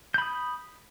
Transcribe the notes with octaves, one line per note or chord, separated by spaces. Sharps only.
B5 D#6 G6